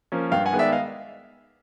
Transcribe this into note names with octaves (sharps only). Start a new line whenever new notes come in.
F3 A#3 C#4
G2 F5 G5
F#5 G#5
D#3 G#3 B3
D5 E5
D#5 F5